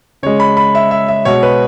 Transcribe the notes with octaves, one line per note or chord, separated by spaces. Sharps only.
C#3 G#3 C#5
B5
B5
E5
E5
E5
B2 G#3 C#5
B4